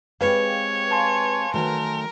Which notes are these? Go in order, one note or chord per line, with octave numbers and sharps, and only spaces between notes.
G#3 C4 G4 B4 C#5 F5
G#5 A5 C6
D#3 F#3 A3 A#4